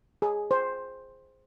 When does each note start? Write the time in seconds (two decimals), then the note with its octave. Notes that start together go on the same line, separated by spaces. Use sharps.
0.22 G#4
0.51 C5